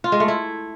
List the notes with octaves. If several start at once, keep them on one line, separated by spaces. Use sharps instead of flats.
F4
G#3
A3
E4